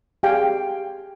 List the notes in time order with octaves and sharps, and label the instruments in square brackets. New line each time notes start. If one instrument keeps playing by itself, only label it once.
[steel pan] G4 G#4 D5 F5 G5 G#5